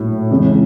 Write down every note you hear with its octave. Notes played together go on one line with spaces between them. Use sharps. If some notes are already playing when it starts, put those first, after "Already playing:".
Already playing: A#1 A2 F#3
F2 C#3 E3 G#3 C#4